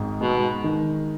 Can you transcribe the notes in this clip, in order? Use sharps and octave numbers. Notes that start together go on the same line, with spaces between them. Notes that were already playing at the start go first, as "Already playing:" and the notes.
Already playing: G#1 G#2
B2 G#3
D#3